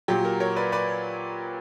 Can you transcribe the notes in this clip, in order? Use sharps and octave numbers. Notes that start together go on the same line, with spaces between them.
A#2 F#3 G4
A#4
A#4 C#5
B4 D5
B4 D5